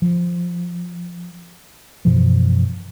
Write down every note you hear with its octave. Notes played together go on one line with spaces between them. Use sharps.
F3
F#2 B2 E3 F3